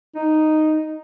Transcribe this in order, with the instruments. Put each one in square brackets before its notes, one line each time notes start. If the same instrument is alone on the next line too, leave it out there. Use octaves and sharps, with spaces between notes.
[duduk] D#4